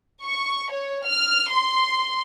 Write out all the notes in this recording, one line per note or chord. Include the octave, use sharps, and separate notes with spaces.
C#6
C#5
F6
C6